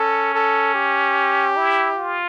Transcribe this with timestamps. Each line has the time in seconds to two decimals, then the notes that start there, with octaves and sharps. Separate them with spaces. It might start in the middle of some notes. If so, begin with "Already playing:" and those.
Already playing: C#4 A4
0.34 A4
0.75 G4
1.57 E4
1.97 F4